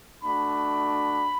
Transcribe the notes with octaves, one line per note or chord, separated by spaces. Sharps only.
A3 D4 F#4 B5